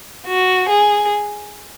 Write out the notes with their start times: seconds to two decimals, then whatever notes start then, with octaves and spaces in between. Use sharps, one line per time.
0.26 F#4
0.69 G#4